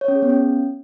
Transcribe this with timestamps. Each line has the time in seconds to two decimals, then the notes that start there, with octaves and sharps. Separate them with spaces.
0.01 C#5
0.08 C#4
0.15 G#4
0.22 B3
0.29 C#4